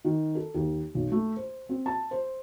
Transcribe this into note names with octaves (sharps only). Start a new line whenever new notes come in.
D#3
A4
D#2
B1
A3
C5
C4
A5
C5